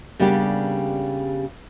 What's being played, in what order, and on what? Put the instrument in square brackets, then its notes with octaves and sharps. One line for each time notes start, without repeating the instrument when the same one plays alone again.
[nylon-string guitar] C#3 G3 A#3 B3 D4 G4